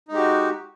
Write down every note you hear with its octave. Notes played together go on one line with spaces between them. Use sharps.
G#3 D#4 F#4 G4